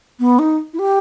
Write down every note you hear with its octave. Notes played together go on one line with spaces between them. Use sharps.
B3
D#4
E4
G4